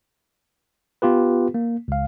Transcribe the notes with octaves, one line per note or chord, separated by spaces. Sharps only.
B3 F4 G4 B4
A#3
C#2 F5